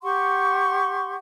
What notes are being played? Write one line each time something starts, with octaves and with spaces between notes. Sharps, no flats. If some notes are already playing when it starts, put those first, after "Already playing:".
G4 F#5 C6 C#6